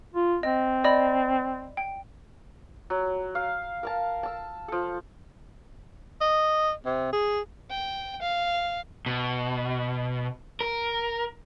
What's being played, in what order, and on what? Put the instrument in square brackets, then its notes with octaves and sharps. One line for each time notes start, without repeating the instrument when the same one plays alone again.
[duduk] F4
[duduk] C4 [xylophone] D#5
[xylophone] D5 D#5 B5
G5
[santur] F#3
F5
A#4 F5 A5
A5 E6
F3 A4
[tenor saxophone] D#5
C3
G#4
[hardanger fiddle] G5
F5
[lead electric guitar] B2
A#4